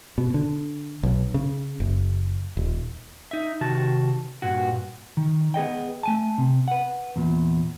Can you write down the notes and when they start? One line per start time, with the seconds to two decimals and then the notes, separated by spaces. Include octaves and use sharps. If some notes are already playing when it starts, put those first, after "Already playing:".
0.18 B2
0.34 D3
1.03 B1
1.34 C#3
1.80 F#1
2.57 D#1
3.31 D#4 E5
3.61 C3 D#3 F#4 A5
4.42 G2 A#2 F#4
5.17 D#3
5.54 B3 G#4 D#5 G5
6.03 A3 G#5 A5
6.38 C3
6.68 B4 F#5
7.16 E2 A#2